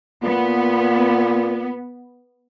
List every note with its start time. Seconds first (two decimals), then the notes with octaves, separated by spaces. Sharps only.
0.23 A#2 B3